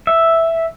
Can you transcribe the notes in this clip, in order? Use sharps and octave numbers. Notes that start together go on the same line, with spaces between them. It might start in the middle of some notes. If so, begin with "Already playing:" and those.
E5